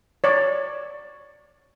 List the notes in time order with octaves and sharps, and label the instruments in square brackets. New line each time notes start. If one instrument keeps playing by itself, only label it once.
[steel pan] C#5 D5